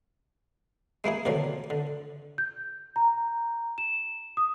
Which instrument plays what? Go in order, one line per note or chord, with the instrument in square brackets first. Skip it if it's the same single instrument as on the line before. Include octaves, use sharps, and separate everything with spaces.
[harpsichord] G#3 A#3 E4 G#4
D2 B2 D3 D#3 F3 F#3
D3
[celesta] G6
A#5
E7
D#6